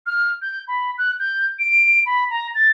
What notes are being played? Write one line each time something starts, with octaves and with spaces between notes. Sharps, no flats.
F6
G6
B5
F#6
G6
D7
B5
A#5
A6